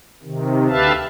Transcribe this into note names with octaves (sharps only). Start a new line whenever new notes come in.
C3 D#3
D2 G4 B4 E5 F5 A5